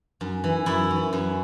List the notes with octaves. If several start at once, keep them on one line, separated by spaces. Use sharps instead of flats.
F#2
E3
F#2 E4
E3
F#2